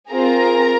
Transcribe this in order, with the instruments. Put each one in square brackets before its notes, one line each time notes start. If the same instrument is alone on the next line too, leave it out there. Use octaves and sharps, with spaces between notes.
[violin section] C4 F4 G#4 A#4 A#5